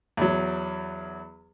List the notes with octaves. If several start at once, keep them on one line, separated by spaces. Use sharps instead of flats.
E2 F#3